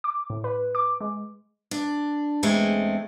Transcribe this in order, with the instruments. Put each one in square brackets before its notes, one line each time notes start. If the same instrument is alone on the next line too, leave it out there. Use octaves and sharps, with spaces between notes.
[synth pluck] D6
A2
B4
D6
G#3
[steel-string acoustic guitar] D4
E2 G#3 A3 C4